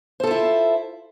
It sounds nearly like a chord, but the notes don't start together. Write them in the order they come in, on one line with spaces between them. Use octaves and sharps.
C5 A4 F4 E4